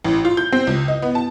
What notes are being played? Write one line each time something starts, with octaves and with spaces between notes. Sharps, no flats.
A1
F4
G6
C4
C#2
D#5
B3
A5